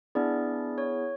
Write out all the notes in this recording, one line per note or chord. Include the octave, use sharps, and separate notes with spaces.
B3 D4 E4 G#4 D5
C#5